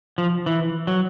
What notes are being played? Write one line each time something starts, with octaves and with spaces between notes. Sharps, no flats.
F3
E3
F#3